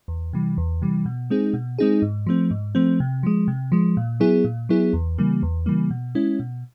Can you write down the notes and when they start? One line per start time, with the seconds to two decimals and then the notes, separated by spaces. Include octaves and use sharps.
0.08 E2
0.33 C3 E3 G3
0.58 E2
0.82 C3 E3 G3
1.06 B2
1.30 G#3 C4 D#4 G#4
1.54 B2
1.79 G#3 C4 D#4 G#4
2.02 G#2
2.27 F3 A3 C4
2.51 G#2
2.75 F3 A3 C4
3.00 C3
3.23 F3 G#3
3.48 C3
3.72 F3 G#3
3.97 A#2
4.20 F#3 B3 E4 G#4
4.44 A#2
4.69 F#3 B3 E4 G#4
4.93 E2
5.18 C#3 E3 G3 A#3
5.43 E2
5.66 C#3 E3 G3 A#3
5.90 B2
6.15 G#3 C#4 E4
6.40 B2